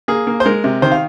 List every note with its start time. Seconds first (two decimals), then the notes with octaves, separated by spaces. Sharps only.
0.08 A#3 G#4
0.27 A#3
0.40 C5
0.46 G#3 A#4
0.64 C3
0.82 D#3 C5
0.92 F5